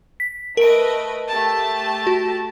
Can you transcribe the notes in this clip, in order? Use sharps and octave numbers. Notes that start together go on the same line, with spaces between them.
B6
A3 A#4 B4 D#5 D7
A3 G4 A5
F#4